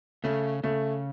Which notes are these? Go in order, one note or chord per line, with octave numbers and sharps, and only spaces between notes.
C#3 A3
C#3 A3